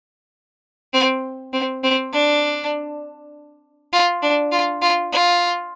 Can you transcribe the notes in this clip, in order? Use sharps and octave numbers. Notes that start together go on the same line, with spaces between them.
C4
C4
C4
D4
F4
D4
F4
F4
F4